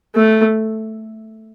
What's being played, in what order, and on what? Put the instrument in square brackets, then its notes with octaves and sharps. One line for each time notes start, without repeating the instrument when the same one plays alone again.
[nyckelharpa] A3